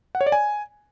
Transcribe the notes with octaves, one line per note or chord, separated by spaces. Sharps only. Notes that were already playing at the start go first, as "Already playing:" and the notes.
F#5
C#5
D5
G#5